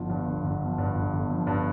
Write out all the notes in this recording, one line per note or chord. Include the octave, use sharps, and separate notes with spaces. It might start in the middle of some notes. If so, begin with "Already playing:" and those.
Already playing: G1 F3
G2
G1
G1
F3
G2
G1
G1
F3
G2